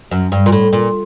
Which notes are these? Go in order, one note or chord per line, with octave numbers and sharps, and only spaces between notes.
F#2
G2
A#2
A2
A#2